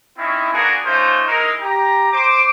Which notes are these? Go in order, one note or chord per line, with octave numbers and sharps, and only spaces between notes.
C4 C#4 D#4 E4
A#3 B3 D4 F#4 G#4 A#4
A3 C#4 D#4 F4 C5
G#3 D#4 E4 A#4
G4 A#5
C5 D6